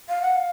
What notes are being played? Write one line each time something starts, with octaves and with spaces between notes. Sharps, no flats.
F5
F#5
F5